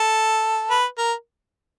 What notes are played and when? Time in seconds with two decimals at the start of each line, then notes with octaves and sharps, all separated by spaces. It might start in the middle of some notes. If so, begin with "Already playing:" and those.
Already playing: A4
0.71 B4
0.98 A#4